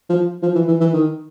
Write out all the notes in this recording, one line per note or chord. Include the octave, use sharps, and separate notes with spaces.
F3
F3
E3
E3
E3
D#3